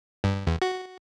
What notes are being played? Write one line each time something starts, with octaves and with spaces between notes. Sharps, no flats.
G2
E2
F#4